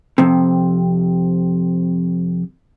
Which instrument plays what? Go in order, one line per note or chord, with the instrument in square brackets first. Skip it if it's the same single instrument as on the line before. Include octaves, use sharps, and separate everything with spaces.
[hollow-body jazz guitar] F2 C3